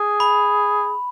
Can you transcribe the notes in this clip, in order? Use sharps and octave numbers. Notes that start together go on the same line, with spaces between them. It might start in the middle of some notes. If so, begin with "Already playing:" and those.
Already playing: G#4
B5